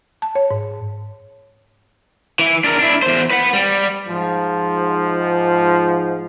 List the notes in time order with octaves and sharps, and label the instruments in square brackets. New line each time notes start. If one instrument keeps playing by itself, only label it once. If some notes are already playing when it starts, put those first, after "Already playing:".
[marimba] A5
C#5
G#2
[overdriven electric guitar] E3
D4 A#4
D4 E4
E2 C5
B4 F#5
G3
[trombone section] G#2 F3